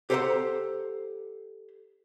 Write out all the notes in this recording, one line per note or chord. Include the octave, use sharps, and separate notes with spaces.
G4 A4 C5 F#5 A#5 C6